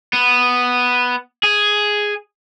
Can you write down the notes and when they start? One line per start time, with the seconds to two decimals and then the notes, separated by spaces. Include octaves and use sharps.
0.13 B3
1.43 G#4